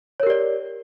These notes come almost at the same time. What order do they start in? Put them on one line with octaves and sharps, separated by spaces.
C#5 A#4 G4 D5